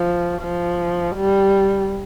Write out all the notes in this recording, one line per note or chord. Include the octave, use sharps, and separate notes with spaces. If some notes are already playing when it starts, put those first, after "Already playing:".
Already playing: F3
F3
G3